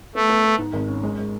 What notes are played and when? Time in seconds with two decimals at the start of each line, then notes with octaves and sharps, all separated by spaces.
0.15 A3 B3
0.30 B3
0.44 B3
0.58 G#2
0.73 G#1
0.88 C#4
1.03 G#3
1.19 G#3